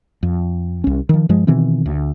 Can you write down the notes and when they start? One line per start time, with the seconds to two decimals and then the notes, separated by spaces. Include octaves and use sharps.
0.23 F2
0.84 C2 C#4
1.09 D#3 F3
1.29 G2 F3 G#3
1.47 B2 D#3 E3 C4
1.86 D2